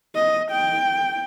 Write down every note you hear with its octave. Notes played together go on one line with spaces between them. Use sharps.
D#5
G5